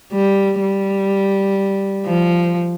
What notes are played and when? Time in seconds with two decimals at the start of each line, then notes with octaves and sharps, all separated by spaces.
0.13 G3
0.61 G3
2.06 F3